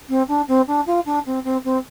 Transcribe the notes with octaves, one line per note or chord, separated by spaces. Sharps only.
C4
D4
C4
D4
F4
D4
C4
C4
C4